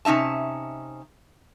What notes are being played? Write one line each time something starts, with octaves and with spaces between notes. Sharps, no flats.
C3 C#4 D#4 E5 A5